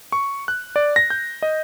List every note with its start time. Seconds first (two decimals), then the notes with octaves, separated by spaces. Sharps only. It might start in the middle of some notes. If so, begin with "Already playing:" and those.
0.12 C#6
0.48 F#6
0.76 D5
0.96 A#6
1.10 G6
1.43 D#5